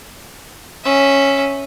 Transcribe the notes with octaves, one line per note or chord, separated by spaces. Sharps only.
C#4 E5